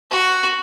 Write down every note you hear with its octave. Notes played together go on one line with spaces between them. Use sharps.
F#4